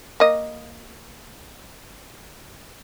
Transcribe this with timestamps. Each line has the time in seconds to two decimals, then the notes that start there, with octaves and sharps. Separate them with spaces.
0.20 A#3 D#5